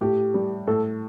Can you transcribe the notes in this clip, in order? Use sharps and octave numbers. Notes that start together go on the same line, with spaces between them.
A2 G4
G3
A2 A4